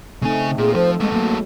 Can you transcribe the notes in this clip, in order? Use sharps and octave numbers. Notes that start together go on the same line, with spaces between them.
C#3 A3 C4 D#4 G#5
A#2 G#4
F3 A4 C5
G#3 A3 B3
F#3 G#3 A#3